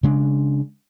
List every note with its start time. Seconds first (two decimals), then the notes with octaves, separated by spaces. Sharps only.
0.03 C#3 G#3 D4